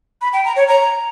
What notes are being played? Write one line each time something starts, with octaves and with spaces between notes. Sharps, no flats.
B5
G5
A#5
C#5
A#5